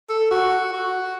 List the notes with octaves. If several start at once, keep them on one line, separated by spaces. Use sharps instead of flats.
A4
F#4
F#4